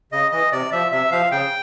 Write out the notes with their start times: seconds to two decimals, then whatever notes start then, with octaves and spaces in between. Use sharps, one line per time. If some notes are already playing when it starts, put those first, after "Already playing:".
0.12 C#3 D#5
0.32 E3 D#5
0.52 C3 D5
0.72 F3 E5
0.92 C3 E5
1.11 F3 F5
1.32 C#3 G5